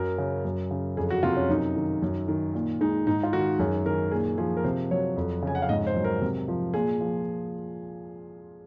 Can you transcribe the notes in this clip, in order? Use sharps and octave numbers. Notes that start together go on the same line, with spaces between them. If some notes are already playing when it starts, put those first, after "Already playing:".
Already playing: F#2 F#3 A#4
C#3
F#2
C#3
F2 G#4
F#4
C3 F4
C#4
F#2 D#4
D#3
F#2
D#3
A#2
G#3 D#4
G#2 D#4
F4
D#3 F#4
F#2 G#4
D#3 A#4
A#2 G#4
F3 G#4
A#4
C3 C5
F#3 C#5
F2
C#3 G#5
F#5
F5
G#2 D#5
C5
F#3
A#4
C3
F3
A#2 G#4
F3